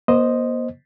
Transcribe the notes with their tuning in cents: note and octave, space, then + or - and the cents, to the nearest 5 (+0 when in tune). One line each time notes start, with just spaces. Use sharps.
A#3 +45 C5 +0 D#5 +0